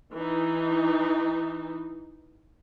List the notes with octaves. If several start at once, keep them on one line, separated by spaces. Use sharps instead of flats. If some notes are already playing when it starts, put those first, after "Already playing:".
E3 D#4